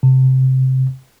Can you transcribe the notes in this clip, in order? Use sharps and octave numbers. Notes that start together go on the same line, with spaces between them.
C3